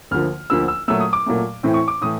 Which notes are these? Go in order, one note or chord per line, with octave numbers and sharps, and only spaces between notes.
D2 D3 F3 A#3 F6
D2 D3 F3 A#3 E6
E6
A#2 F#3 A3 E6
D#6
D6
A#2 F#3 A3
A2 E3 A3 C4
C#6
D6
A2 E3 A3 D#6